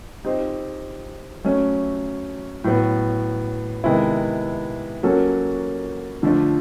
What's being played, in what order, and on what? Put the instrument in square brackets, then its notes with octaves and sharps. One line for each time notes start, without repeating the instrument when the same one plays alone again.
[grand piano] C4 D#4 G4 C5
F#3 A3 C#4
A2 F#3 B3
C3 D#3 G#3 B3 E4
F#3 A#3 C#4 F#4 A4
D3 F3 A3 D4